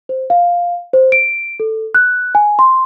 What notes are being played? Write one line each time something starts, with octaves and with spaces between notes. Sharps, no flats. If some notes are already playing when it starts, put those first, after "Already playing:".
C5
F5
C5
D7
A4
F#6
G#5
C6